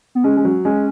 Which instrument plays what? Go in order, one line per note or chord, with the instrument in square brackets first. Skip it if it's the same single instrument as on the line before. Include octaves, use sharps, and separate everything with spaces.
[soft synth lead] B3
[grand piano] G#3 [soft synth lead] C#4
[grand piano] G#3
F#3
[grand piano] G#3 [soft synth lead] C#4